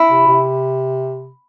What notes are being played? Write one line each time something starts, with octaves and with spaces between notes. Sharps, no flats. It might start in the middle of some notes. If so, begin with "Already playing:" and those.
Already playing: E4
C3
C3